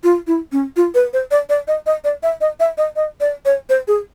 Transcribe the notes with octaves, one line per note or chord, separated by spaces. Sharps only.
F4
E4
C#4
F4
B4
C5
D5
D5
D#5
D#5
D5
E5
D#5
E5
D#5
D#5
D5
C#5
C5
G#4